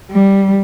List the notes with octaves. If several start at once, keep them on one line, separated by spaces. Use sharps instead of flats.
G3